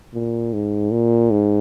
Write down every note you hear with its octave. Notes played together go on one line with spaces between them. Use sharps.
A#2
G#2
A#2
G#2